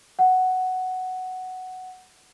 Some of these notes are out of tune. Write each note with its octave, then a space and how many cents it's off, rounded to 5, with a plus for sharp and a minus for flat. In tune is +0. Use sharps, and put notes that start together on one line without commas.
F#5 +5